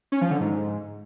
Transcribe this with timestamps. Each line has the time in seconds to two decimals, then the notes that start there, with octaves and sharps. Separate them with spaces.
0.12 C#4
0.21 F3
0.31 D3
0.40 G#2